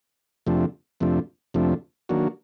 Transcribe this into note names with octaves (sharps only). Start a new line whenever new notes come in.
F2 C3 F3 A3 D4
F2 C3 F3 A3 D4
F2 C3 F3 A3 D4
D#3 F#3 A#3 D4 F#4